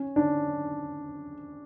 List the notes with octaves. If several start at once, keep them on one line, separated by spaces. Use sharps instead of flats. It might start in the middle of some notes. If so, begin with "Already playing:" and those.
Already playing: C#4
D4